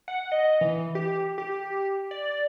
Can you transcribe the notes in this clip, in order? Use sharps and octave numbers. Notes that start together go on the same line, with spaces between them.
F#5
D#5
E3
G4
G4
D5